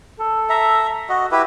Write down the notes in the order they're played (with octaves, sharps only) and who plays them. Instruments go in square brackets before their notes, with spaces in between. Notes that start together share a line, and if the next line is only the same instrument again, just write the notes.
[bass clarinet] A4
[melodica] E5 A#5
F#4 D#5
E4 G4 B4